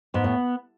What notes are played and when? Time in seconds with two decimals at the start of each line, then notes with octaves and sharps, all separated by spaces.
0.14 G#2 B3
0.24 A2